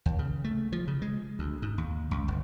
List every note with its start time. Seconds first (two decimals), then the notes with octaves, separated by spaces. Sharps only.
0.06 D#2
0.19 C#3
0.44 A3
0.72 F3
0.88 C#3
1.02 G#3
1.39 D2
1.62 G#2
1.78 D#2
2.11 C#2
2.28 G1